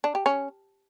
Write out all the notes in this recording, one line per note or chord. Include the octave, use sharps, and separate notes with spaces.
D4
G4
C#4